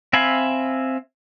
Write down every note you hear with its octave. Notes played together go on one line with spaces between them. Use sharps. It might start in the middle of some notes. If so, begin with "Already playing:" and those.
C4 E5 F5 G#5 B5